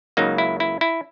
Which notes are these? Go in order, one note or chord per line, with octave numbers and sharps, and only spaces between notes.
C#2 C#3 F#3 A#3 D#4
E4
E4
E4